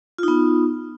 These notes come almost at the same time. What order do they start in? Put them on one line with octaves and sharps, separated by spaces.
F4 D#4 B3